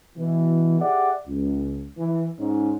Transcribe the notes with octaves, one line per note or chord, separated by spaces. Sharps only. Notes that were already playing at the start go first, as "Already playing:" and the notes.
B2 E3
G4 G#4 D5 E5 F#5
C#2
E3
G#2 C#4 D#4